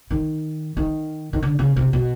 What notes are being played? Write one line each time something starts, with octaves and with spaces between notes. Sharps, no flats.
D#3
D#3
D#3
D3
C#3
C3
B2